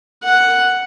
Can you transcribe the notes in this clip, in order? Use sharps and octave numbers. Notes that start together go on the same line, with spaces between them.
F#5